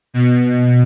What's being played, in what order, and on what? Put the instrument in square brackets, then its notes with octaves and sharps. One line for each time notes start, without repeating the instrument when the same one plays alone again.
[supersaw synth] B2